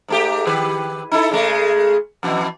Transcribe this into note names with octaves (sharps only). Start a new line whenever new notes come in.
G#2 A3 G4
D#3 G4 B4
D#4 E4 A4
C#3 G#3 A3
F2 B2 E3